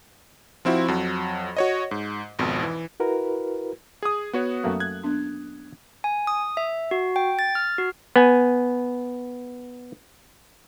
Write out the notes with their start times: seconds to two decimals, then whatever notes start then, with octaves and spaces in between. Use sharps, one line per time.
0.65 F3 C4 E4 F#4
0.88 F2 F#3
1.56 F#4 C#5 D#5
1.91 G#2
2.39 G#1 F2 B2
2.62 E3
3.00 E4 F#4 A#4 B4
4.02 G#4 D#6
4.33 B3 F#4 C#5
4.64 F#2 A3 A#3
4.80 F#6 G#6
5.03 B3 D4
6.04 G#5
6.27 D#6
6.57 E5
6.91 F#4
7.16 G5
7.39 A6
7.55 F6
7.78 F#4
8.16 B3 G#5